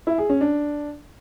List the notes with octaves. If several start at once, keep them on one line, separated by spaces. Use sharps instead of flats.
E4
G#4
C#4
D4